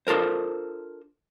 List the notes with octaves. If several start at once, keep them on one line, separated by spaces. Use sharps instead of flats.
D4 F4 A4 A#4 C5